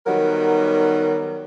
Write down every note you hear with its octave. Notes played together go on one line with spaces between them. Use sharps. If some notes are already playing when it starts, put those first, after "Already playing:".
D#3 F#3 G3 B3 A#4